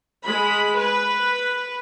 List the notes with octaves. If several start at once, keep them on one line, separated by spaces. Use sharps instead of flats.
G#3 B5
B4